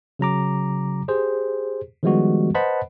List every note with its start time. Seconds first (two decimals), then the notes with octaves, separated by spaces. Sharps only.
0.19 C#3 F#3 A#5 D6
1.08 G4 G#4 C5
2.03 D#3 F3 G3 G#3 B3 F#4
2.55 B4 C5 D#5 F#5 A5 B5